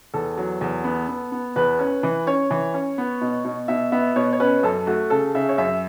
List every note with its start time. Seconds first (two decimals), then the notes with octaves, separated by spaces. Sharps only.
0.14 E2 A4
0.37 F#3
0.61 E2
0.84 B3
1.08 B3
1.32 B3
1.56 E2 B4
1.79 C#4
2.03 E3
2.27 C#4 C#5
2.51 E3
2.74 C#4
2.98 B3
3.21 B2
3.45 B2
3.68 B2 E5
3.92 B3 E5
4.16 B2 C#5
4.33 C#5
4.40 C#4 B4
4.63 F#2 A4
4.87 A3 F#4
5.10 C#3 A4
5.35 C#3 E5
5.49 C#5
5.58 F#2 E5